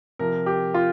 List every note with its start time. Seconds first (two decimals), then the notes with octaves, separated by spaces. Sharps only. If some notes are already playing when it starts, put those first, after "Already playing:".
0.19 C3 F3 A#4
0.46 G4
0.74 F4